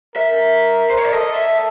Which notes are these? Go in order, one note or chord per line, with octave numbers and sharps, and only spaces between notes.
A#4 E5
C5
C#5
D5
A4 D#5
E5